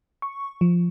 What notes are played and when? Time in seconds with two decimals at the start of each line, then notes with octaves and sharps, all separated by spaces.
0.22 C#6
0.61 F3